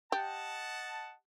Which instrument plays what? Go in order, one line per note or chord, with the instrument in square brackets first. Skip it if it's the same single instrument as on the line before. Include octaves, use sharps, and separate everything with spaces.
[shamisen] G4 [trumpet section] D#5 F#5 A5